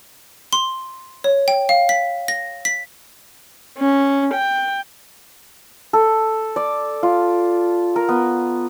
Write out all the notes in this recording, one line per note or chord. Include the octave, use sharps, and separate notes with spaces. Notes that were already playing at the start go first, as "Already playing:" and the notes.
C6
C#5
G5
F5
B6
A#6
B6
C#4
G5
A4
D5
F4
A#4
B3